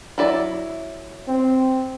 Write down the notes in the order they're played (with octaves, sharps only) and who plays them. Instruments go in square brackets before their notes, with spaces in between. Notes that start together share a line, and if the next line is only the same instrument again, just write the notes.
[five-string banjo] F#3 E4 D5
[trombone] C4